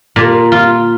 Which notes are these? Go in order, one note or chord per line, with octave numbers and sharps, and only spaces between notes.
A#2
F4